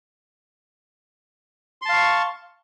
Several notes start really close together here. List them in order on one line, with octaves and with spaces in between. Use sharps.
C6 A5 F5 C#6